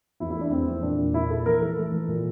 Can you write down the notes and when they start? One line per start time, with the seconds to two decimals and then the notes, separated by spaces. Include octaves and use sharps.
0.20 E2 E4
0.31 E4
0.36 A3
0.41 D4
0.52 E2 C4
0.68 E2
0.82 A#2 D4
0.98 A#3
1.14 A#2 E4
1.30 A#3 A4
1.46 E3 A#4
1.61 E3 A4
1.77 A3
1.92 E3
2.08 A#2